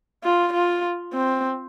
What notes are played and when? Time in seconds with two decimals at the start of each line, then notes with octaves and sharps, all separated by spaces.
0.24 F4
0.53 F4
1.13 C4